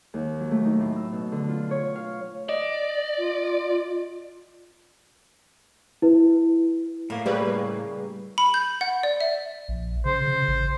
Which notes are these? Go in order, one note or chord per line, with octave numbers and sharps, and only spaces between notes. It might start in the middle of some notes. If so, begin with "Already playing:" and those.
D#2
F#3
A3
D#4
A2
E6
B2
D3
F4
C#5
F5
D5 D#5
F4
E4 B4
A2 A#3 A#4
C#3 E3 G3 G4 B4
B5
G6
F#5
D5
E5
A#1
C#3 C5
C#3
A1